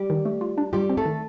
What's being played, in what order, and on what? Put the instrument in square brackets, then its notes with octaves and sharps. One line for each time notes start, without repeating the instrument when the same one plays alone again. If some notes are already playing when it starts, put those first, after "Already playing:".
Already playing: [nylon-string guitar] G3 G4
[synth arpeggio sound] D#3
A3
F4
D4
[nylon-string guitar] G3 G4 [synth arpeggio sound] F4
[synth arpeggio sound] C4
[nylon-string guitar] A3 A4
[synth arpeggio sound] D#3